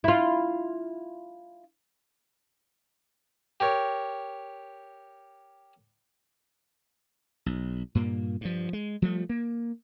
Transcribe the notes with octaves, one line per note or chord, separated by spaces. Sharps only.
E4 F4
G4 A#4 C#5
B1
G2 A#2 A#3
G2 F3
G#3
F3 G3 A3
A#3